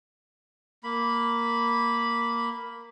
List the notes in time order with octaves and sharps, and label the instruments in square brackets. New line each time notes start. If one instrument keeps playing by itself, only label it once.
[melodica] A#3 B5